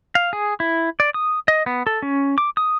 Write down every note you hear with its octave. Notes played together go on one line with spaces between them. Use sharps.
F5
G#4
E4
D5
D#6
D#5
B3
A4
C#4
D6
D#6